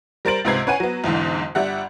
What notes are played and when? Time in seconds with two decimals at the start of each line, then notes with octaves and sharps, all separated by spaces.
0.25 G3 A#4 C5 A6 D7 F#7
0.45 C#2 G#2 C3 B4 G#6 C7
0.67 C#4 B4 F#5 G#5 D#7
0.80 F#3 B3
1.04 B1 E2 G#2 D3
1.55 G1 G3 E5 F#5